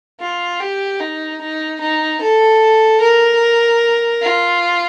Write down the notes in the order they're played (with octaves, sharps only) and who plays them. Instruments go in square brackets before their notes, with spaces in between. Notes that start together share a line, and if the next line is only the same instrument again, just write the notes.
[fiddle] F4
G4
D#4
D#4
D#4
A4
A#4
F4